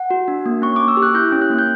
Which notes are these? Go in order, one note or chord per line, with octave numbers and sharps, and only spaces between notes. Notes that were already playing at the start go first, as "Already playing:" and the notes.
Already playing: F#5
F#4
D4
A#3
C#4 C#6
A#3 D6
E6
G4
F#6
E4 G6
C#4
F#6
A#3
G6